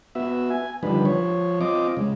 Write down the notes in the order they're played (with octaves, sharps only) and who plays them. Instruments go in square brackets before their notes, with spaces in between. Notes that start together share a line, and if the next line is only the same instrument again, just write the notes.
[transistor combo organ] B3 F#4 E5
G#5
D3 D#3 F3 G3 B4
F3 C#5
C4 F4 D#5 D6
C#3 G#3